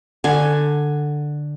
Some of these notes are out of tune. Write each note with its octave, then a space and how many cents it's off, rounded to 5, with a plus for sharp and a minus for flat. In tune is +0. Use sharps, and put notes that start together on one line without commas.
D3 +10 G#5 +5